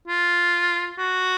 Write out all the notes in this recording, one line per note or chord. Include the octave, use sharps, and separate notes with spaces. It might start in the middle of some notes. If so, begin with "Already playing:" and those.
F4
F#4